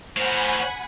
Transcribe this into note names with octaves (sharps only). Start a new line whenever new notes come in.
A2 A#4 C5 F#5 G#5 B5